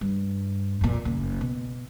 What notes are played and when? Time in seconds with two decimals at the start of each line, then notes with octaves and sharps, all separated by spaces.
0.01 G2
0.81 F2 A#2
1.05 F#1
1.41 B2